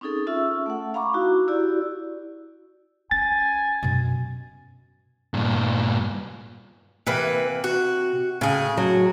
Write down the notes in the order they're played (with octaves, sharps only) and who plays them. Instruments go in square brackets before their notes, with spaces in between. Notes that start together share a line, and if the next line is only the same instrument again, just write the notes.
[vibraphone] C4 C#4 D#4 G#4 A4
C#4 F4 A4 E5 E6
A3 F#5
F5 A#5 B5 C#6 D6
D#4 E4 F#4
E4 F#4 G4 D5
[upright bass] C#4 [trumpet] G#5 [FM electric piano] A6
[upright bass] F#2 B2
[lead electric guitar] G2 A#2
[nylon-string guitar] C3 [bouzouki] E3 A#3 B4
[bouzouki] F#4
[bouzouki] A2 G#4 [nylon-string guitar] C#3
[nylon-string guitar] F#3